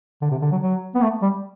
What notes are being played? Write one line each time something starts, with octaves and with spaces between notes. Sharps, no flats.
D3
C3
D3
F#3
F#3
B3
A3
G3